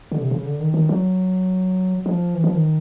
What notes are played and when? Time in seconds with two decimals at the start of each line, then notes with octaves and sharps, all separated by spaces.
0.12 D3
0.21 C3
0.31 C#3
0.46 D3
0.60 D#3
0.74 D#3
0.89 F#3
2.06 F3
2.34 E3
2.44 F3
2.55 D#3